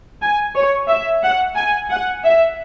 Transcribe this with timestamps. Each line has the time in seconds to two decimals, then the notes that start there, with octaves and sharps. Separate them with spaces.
0.21 G#5
0.55 C#5
0.88 E5
1.23 F#5
1.56 G#5
1.90 F#5
2.24 E5